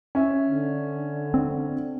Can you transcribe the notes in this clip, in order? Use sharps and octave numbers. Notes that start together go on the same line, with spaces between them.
C#4 E5
D3
C4